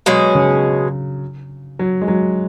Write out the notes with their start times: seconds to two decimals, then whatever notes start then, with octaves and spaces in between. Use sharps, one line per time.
0.06 B2 F#3 G#3 C#4
0.35 C#3
1.79 F#3
2.02 G#3
2.08 F#3